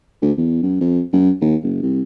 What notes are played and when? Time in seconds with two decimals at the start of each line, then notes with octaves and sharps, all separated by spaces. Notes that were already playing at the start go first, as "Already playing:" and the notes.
0.22 D2
0.38 E2
0.63 F#2
0.81 F2
1.13 F#2
1.41 D#2
1.63 F#1
1.83 C2